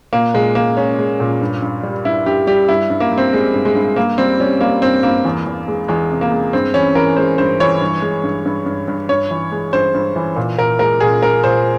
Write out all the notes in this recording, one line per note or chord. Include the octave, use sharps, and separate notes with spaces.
A#2 A#3
A#2 G#3
G#3 A#3
G#3 C#4
G#3
A#2
G2
G2
G3
G2 E4
G2 G4
G3 G4
G2 E4
G2
A#3
G2
C4
G3 G#3
G2
G#3
G2
G2 A#3
G3 C4
G3 C#4
G3 A#3
G2 C4
G2 A#3
E2
E2
G#3
E2 G#3
C3
A#3
G#3
G2 C4
E3 C#4
E3 A#4
G#3 C5
G2 C5
E3 C#5
G2
G#3
G2
G2
G2
G2
G2 C#5
E3
G#3
G2 C5
G2
E3
A#2
A#2 A#4
G#3 A#4
A#2 G#4
G#3 A#4
A#2 C5